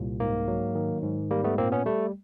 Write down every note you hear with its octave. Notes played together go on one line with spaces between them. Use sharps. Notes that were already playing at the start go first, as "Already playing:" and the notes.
Already playing: C2 A#2
G#2 A#3
F#3
D#3
G#2
G3 A#3
A3 B3
A#2 A#3 C4
B3 C#4
G3 A3